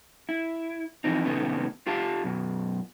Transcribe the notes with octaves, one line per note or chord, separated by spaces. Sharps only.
E4
E3 F3 C4 D#4
A2 C3 D#3 A3 B3 C#4
F4 G4 F5 A5
F#2 B2